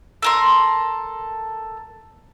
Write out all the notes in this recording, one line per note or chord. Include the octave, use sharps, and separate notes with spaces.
A4 A#4 C6